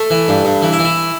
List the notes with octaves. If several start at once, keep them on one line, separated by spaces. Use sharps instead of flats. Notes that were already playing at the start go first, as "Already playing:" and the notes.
Already playing: A3
E3
G2
G2
E3
E4
E3
E4